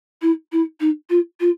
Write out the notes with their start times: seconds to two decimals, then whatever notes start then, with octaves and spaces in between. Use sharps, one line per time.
0.22 E4
0.52 E4
0.80 D#4
1.10 F4
1.40 F4